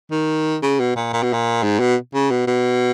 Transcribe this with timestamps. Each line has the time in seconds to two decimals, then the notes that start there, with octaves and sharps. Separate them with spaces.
0.11 D#3
0.62 C#3
0.80 B2
0.96 A#2
1.13 A#2
1.23 B2
1.33 A#2
1.63 G#2
1.80 B2
2.14 C#3
2.31 B2
2.47 B2